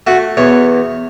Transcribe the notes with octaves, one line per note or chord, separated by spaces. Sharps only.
A3 F#4
E2 C#5